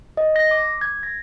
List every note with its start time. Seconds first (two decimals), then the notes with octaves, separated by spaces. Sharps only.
0.17 D#5
0.36 A#6
0.51 D6
0.81 G#6
1.03 A#6